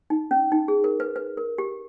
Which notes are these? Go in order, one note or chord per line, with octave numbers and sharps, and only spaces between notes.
D#4
C#4
D#4
G#4
A#4
B4
B4
A#4
G4